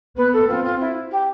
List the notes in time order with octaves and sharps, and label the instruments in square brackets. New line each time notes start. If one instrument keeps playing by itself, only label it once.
[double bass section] B3 [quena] B4
[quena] A4
[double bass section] C4 [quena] F4
[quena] F4
E4
G4